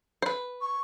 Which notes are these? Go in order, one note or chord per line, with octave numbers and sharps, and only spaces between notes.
C5
B4
C#6